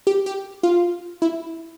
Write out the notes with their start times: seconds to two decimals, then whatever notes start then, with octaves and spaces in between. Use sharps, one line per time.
0.07 G4
0.26 G4
0.63 F4
1.22 E4